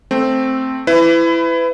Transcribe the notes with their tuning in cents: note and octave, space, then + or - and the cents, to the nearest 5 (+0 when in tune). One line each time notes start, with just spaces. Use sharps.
A3 +0 C4 +0
E4 +15 B4 +30